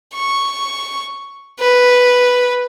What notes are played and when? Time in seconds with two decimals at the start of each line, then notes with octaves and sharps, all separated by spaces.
0.14 C#6
1.60 B4